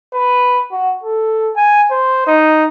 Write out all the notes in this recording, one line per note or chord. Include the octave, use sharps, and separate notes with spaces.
B4
F#4
A4
G#5
C5
D#4